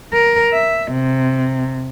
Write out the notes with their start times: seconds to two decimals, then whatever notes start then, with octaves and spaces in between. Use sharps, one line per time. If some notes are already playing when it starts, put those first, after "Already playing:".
0.13 A#4
0.53 E5
0.91 C3